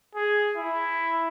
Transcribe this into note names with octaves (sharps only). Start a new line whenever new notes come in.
G#4
E4